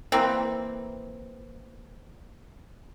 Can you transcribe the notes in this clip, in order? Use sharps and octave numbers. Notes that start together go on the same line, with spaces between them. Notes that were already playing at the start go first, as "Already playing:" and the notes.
E3 A#3 C4